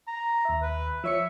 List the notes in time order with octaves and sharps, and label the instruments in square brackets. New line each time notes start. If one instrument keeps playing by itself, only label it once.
[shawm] A#5
[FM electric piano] D#2 E5
[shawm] B4
[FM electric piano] F3 C#5 C#7 [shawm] E5